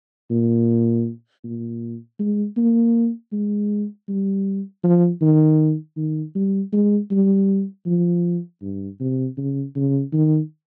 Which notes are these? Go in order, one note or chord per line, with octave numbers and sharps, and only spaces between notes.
A#2
A#2
G#3
A#3
G#3
G3
F3
D#3
D#3
G3
G#3
G3
F3
G2
C3
C#3
C#3
D#3